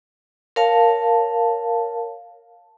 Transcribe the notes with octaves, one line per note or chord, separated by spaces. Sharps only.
A#4 C#5 F5 A5